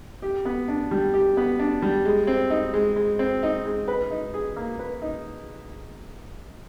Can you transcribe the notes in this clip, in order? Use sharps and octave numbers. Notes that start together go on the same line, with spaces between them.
G4
B3
D4
G3
G4
B3
D4
G3
G#3
C4
D#4
G#3
G#3
C4
D#4
G#3
B4
D#4
G#4
A#3
B4
D#4